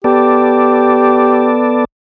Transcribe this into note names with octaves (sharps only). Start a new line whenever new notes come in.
B3 G4 A4 D5